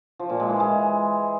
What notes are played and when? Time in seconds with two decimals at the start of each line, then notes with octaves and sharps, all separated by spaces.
0.19 F3
0.30 A#2
0.40 G#3
0.50 E3
0.60 G#3